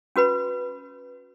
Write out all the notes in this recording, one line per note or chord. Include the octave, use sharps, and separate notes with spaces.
C#4 F#4 B4 B5